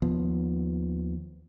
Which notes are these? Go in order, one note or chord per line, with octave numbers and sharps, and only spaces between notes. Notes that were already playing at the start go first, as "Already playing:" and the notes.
D#2 F3 B3